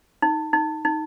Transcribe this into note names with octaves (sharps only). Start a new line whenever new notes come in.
D#4
D#4
D#4